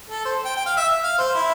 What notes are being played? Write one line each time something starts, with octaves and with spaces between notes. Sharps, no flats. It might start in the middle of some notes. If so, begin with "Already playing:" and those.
A4
C5
G5
G5
F5
E5
F5
C5
E4